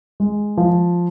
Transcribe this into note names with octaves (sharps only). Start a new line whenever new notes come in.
G#3
F3